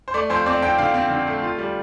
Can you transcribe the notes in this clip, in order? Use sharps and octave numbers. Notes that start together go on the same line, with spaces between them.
C5
A3 D5
F2 C5
C4 D5
F2 G5
D3 F5
C4
D3
A3
F4
G3